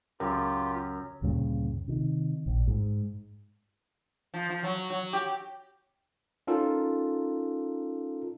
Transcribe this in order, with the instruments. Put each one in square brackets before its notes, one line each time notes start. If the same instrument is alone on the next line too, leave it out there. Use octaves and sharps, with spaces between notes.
[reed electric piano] C#2 C#3 A#4 [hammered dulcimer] F#2 [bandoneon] F4 G4
[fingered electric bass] D2 G2 A#2 C#3
C3 D#3
A#1
G#2
[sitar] F3
F3
F#3
F#3
G4
[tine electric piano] C#4 D#4 F4 A4 A#4